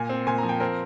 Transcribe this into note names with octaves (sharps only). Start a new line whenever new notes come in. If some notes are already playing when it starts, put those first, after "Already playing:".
Already playing: A#2 G#5
C4
A#2 G#5
F3 A#5
G5
C4 A#4